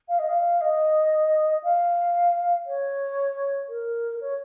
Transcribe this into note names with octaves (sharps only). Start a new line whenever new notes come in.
F5
D#5
F5
D#5
F5
C#5
A#4
C#5